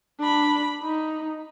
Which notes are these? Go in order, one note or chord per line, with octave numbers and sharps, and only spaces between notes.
D4 B5
D#4